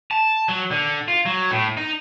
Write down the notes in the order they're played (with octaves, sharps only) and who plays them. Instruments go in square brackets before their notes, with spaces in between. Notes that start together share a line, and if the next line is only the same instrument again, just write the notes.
[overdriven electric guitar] A5
F#3
D3
F4
F#3
A2
D#4